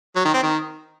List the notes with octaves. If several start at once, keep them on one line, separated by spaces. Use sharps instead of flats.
F#3
D#3
C4
D#3